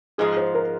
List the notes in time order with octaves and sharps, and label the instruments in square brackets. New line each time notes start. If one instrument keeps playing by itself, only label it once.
[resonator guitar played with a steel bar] G#2 F3 G#3 [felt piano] G#4
[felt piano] C5
A#4